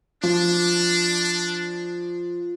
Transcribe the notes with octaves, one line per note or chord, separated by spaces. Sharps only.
F3 D4